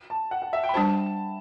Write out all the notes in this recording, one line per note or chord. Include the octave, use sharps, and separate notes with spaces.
A5
F#5
F#5
E5
G5
B5
G3 D4 F#4 C5 A5